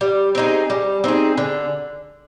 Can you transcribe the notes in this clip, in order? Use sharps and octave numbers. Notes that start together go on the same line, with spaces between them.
G3
C4 D#4 G#4
G3
C4 D#4 G#4
D3